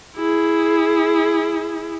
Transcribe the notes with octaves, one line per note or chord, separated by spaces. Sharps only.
E4 G#4